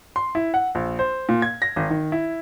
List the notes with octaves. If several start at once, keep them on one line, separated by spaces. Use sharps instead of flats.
C6
E4
F#5
A#1
C5
A#2
G#6
A#6
G#1
D#3
E4